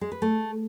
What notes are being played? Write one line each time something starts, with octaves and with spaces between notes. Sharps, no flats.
G#3
B4
A3